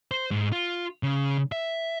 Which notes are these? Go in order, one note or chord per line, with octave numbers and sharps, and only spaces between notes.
C5
G#2
F4
C#3
E5